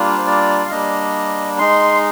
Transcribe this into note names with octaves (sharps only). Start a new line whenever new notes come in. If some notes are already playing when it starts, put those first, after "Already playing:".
Already playing: G3 A#3 D4 F4
C5
D5
F5
G3 A#3 D4 D#5
G#3 D#4 C6